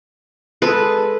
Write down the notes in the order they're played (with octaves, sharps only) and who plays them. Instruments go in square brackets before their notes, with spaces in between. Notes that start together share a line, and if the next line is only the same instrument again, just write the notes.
[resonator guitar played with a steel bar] G#3 A4 [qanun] B4